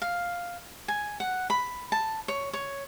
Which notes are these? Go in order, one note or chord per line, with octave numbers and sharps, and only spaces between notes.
F5
G#5
F#5
B5
A5
C#5
C#5